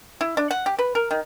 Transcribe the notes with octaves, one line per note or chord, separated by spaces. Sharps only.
E4
D4
F#5
G4
B4
A#4
D#3